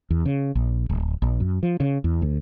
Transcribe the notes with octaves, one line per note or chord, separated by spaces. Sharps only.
E2
C#3
A#1
D1
A#1
F#2
F3
C#3
E2
D2